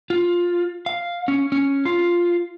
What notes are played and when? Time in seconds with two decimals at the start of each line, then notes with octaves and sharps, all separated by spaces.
0.10 F4
0.86 F5
1.28 C#4
1.52 C#4
1.85 F4